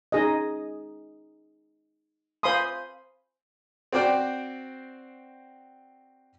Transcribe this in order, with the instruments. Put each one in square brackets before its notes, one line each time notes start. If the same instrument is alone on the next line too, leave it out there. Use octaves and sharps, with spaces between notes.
[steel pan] D#4 G#4 D#5
C5 F5 G#5 B5 C6 D#6
[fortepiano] C4 F#4 C5 D5 G5